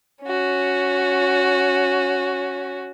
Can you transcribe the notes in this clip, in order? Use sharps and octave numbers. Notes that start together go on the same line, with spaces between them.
C#4 F#4